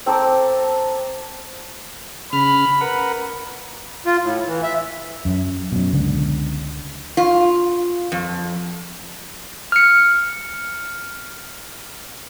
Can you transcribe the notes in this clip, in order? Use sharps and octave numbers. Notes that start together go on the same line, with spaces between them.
C4 A4 A#5 D6
C#3 B5 F6
A#4 B4 F#5
F4
A2
E3
E5
F#2
F#2 B2
C#2 D3
F4
F2
F6 C#7